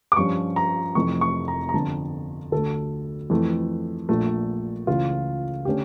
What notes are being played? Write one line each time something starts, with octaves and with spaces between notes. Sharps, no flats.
D6
G2 F3 C#4 C#6
A#5
F1 F2 E3 A3 C#6
C#6
A#5
A#5
G1 F2 D3 F3 A5
D2 D3 A3 A4
F2 E3 A3
A#1 A#2 A3
C#2 C#3 E3 A3 F4
D3 A3 C#4 G4